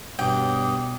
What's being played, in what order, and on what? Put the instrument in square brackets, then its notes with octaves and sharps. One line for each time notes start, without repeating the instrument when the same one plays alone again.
[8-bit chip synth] G2 [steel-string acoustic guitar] B2 [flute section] C#5 D6 D#6 [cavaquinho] G5